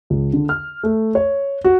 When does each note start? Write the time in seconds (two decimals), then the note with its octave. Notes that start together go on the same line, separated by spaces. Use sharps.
0.10 C#2
0.33 D3
0.49 F6
0.83 A3
1.15 C#5
1.64 F#4